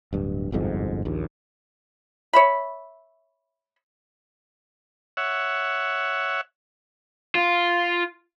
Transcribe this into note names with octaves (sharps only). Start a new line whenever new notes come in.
D1 G2
G1 C2 F2 G#2
A#1 D#2
C#5 E5 B5
C#5 E5 F#5
F4